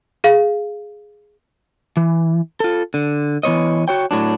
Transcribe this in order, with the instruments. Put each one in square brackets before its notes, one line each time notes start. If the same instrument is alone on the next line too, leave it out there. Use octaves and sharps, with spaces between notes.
[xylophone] G#4 F5
[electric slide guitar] E3
F4 A4
D3
E3 B3 C#5 D#5
F#4 C#5 G5
A2 F#3 D4